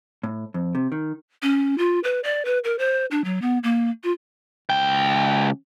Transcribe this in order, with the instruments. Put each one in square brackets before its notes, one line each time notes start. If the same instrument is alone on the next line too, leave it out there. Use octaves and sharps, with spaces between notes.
[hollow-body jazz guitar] A2
F2
C3
D#3
[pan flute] C#4
F4
B4
D5
B4
A#4
C5
D4
F#3
B3
A#3
F4
[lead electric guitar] C#2 G5